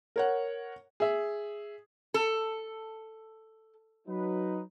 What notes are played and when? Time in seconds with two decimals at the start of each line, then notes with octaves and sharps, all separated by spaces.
0.16 A#4 C#5 F#5
1.00 G#4 E5
2.14 A4
4.07 F#3 D#4 B4